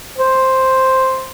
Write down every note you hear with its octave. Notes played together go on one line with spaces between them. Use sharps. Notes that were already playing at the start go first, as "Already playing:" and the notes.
C5